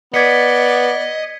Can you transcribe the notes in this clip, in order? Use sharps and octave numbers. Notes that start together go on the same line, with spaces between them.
B3 D5 D#5 G#6 B6 C#7